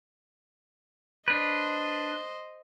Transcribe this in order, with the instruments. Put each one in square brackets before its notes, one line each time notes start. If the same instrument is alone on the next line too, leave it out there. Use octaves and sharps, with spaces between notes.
[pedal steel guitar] D4 B4 [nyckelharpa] C5 D#5